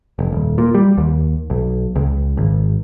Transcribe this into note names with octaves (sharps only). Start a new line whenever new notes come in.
F1
D#1
A#2
G3
D#2
B1
C#2
G#1